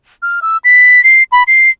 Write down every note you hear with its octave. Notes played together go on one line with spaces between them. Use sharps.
F6
E6
B6
C7
B5
C7